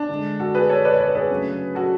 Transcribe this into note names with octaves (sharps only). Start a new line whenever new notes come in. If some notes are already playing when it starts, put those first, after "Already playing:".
Already playing: D4
D3 G#3
F#4 A4
G#4 B4
A4 C#5
B4 D5
C#5
B4 D5
G#4 B4
C#3 F#3 A3
F#4 A4